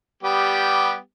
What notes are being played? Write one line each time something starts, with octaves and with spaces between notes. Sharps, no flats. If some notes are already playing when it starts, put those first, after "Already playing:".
G3 B3 G4